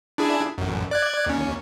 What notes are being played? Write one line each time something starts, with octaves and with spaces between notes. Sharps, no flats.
D4 E4 G#4
A1 F#2
D5 F#6 G#6
D#2 C#4